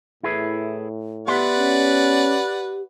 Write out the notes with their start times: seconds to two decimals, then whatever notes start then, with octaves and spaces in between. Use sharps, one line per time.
0.23 A2 E4 G#4 B4
1.27 B3 G4 B4 D5 E5 F#5 C6
1.58 C#4